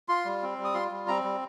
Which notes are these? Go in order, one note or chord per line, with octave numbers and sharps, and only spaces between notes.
F4 C6
G3
C4
G3
D#6
F4 C6
G3
C4 A#5
G3